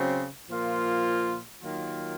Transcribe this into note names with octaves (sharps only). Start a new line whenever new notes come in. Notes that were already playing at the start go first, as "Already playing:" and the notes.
Already playing: C#3 F#3 C4
A#2 F3 A#3 F4
D#3 F#3 A#3 F4